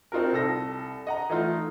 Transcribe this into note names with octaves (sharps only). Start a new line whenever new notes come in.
C4 D#4 F4 F#4 A#4
C2 A4 A#6
D#5 F#5 A#5
E3 A3 D#4 F4